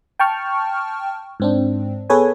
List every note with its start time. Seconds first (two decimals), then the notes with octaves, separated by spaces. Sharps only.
0.19 G5 A5 C#6 F6
1.40 G#2 C4 D4
2.10 B3 G#4 A4 B4 C#5 G#5